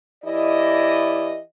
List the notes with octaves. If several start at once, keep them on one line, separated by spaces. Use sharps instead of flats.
E3 E4 G4 D5 D#5